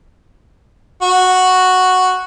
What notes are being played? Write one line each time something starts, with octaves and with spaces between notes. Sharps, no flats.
F#4